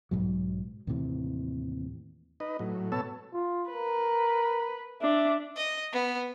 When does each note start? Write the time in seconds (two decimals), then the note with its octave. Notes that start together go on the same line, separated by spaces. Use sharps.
0.11 B1 G#2 F#3
0.87 D#2 A2 C3 E3
2.40 D#4 B4 D#5
2.59 A2 F#3
2.92 B2 B3 A4 C#5 A5 E6
3.34 F4
3.70 A#4 B4
5.01 D4 E5
5.56 D#5
5.93 B3